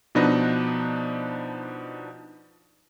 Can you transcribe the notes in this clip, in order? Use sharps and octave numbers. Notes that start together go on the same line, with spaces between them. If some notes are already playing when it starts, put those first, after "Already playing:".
B2 F3 D4 D#4 B4 A#6